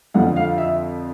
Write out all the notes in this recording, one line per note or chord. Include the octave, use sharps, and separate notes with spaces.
F2 D3 F3 F#5
F5
E5